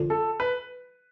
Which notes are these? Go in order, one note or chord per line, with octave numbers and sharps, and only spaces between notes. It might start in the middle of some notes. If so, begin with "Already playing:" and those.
Already playing: F2 D3 F3
A4
B4